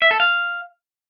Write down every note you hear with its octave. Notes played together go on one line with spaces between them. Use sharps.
E5
A4
F5